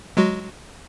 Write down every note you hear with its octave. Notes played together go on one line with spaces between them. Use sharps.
F#3 G#3 F#4